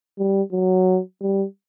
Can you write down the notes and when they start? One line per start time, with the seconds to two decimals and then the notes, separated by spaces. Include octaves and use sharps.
0.18 G3
0.52 F#3
1.21 G3